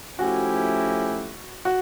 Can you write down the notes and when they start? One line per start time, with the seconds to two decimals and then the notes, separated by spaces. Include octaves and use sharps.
0.18 F3 A3 C#4 E4 F#4 G4
1.65 F#4